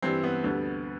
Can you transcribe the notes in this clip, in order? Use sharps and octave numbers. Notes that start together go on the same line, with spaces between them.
G2 E3 G3 C4
B3
D2 D3 G3